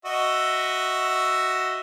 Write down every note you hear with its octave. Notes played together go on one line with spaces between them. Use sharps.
F#4 D#5 E5